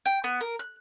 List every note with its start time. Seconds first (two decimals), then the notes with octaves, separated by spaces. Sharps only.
0.06 G5
0.24 B3
0.41 A#4
0.59 F#6